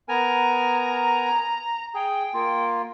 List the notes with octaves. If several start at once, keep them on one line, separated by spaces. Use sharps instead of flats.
B3 A#4 G#5 A#5
G#4 G5
A#3 F4